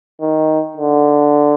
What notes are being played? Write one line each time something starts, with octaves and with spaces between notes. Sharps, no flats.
D#3
D3